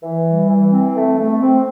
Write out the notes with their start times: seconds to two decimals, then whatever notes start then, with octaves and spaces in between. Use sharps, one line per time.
0.03 E3
0.27 G3
0.49 E3
0.72 C4
0.95 A3
1.19 A3
1.41 C4